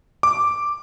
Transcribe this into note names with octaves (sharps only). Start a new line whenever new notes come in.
D6